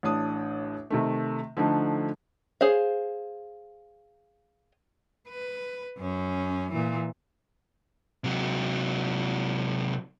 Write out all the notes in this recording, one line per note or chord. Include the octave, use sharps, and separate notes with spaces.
A1 A2 D4 D#6
C3 D#3 A3
D3 F3 A3 D4 D#4
G#4 C5 C#5 F5
B4
F#2 C#4
A#2 E3
C3 F#3